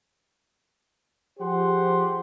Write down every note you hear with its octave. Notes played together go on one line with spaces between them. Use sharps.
F3 G4 G#4 C5 F#5 C6